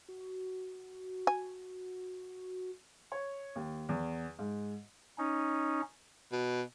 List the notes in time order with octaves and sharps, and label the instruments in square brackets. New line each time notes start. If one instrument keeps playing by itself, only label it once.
[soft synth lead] F#4
[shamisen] G#5
[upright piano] C#5
D#2
E2
G#2
[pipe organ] C#4 D#4
[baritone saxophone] B2